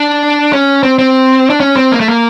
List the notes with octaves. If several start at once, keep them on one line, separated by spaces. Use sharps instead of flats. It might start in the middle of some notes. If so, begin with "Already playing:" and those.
Already playing: D4
C#4
C4
C4
D4
C#4
C4
A#3
A3
A#3